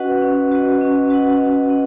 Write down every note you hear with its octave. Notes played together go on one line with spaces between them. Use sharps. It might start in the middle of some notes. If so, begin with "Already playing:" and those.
Already playing: C#4 F#4 B4 D#5 F#5
C#4
F#4 B4 D#5 F#5
C#4
F#4 B4 D#5 F#5
C#4
D#5 F#5